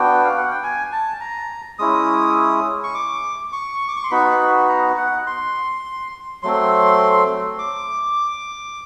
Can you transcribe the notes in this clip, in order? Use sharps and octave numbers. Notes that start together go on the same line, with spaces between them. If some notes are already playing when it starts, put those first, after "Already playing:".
Already playing: B3 D4 F#4 G5
F5
F#5
G5
G#5
A5
A#5
G#3 C#4 E4 D#6
C#6
D6
C#6
D6
C#6
C6
B3 D#4 F#4 B5
A#5
F#5
C6
F#3 A3 C4 C6
D6